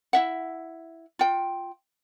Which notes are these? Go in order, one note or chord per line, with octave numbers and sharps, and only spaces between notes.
E4 E5 F#5
F4 G5